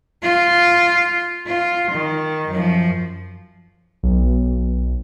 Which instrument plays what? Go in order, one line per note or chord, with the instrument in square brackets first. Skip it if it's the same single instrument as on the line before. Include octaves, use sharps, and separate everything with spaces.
[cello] F4
F4
D#3
F#2 F3
[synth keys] B1